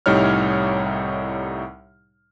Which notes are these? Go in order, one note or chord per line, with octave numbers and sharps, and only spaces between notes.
C2 A2 G3 D#4 C#5 F6